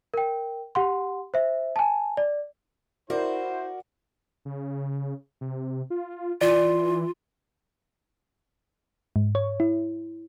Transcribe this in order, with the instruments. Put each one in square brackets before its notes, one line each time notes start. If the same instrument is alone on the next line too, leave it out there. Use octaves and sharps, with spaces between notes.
[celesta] A#4 G5
G4 F#5 C6
C5 E5
G#5 A5
D5
[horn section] E4 C5 [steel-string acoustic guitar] F#4 [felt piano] A#4 D5
[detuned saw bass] C#3
C3
F4
[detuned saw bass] E3 [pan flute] F4 [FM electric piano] D5
[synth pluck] G#2
C#5
E4